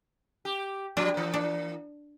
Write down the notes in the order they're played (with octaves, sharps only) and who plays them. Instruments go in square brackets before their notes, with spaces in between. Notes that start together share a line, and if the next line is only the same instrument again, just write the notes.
[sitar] G4
[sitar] F3 G3 [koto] D4
[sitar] E3 A#3
[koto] D4